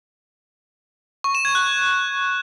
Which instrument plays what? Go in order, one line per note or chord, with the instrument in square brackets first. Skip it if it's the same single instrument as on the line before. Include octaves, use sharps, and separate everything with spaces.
[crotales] C#6
E7
G#6
F#6